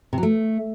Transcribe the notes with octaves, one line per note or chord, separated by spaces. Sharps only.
C3
F#3
A3